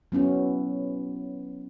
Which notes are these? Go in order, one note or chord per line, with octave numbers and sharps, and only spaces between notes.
F#3 B3 C#4 E4